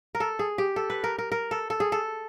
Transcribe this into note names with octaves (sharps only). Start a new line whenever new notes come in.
A#4
A4
G#4
G4
A4
B4
A#4
A#4
A#4
A4
A4
G#4
A4